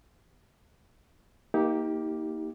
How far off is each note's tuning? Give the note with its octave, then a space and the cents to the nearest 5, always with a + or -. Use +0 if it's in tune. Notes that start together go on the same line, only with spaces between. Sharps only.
A#3 +5 D#4 +35 G4 +0